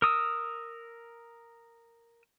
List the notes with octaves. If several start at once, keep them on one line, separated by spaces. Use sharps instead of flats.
A#4 D#6 E6